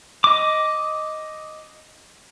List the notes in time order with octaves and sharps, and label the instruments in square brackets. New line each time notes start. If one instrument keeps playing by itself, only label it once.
[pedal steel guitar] D#5 D6